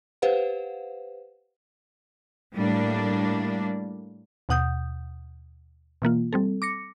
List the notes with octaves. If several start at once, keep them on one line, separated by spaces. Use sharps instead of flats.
G4 B4 C5 F5 F#5
A2 G3 A#3 D4
D#2 B2 F#5 D#6 G6
B2 E3 A#3 F4
G3 C4 A4
D6 A#6 C#7